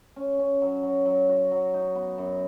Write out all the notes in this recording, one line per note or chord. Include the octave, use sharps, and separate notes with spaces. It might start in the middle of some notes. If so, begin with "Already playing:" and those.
C#4
C#4
F#3
F#3
F#3
F#4
F#3
D#4
B3
F#2